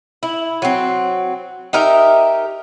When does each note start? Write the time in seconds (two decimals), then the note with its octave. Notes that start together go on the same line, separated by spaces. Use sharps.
0.23 E4
0.62 F#3 C4
1.73 D#4 G4 A#4 E5